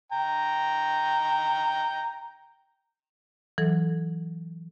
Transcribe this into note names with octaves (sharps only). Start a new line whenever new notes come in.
G5 A#5
E3 F#3 A4